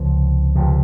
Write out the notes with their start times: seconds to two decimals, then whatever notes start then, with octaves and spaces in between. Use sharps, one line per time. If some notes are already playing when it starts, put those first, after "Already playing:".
Already playing: C#2 C3 F3
0.56 C#2 C3 F3